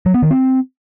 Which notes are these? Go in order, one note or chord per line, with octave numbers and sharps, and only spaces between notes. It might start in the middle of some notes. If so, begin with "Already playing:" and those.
F#3
B3
D#3
C4